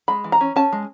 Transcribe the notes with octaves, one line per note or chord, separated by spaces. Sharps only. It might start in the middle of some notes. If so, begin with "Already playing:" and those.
G#3 B5
E3
A#5
C#4
C#4 A5
G#3